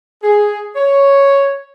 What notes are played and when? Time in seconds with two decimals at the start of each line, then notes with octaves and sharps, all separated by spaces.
0.23 G#4
0.76 C#5